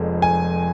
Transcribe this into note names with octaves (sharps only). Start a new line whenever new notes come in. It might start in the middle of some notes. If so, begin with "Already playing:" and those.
Already playing: F1 F2 F3 G#3
G#5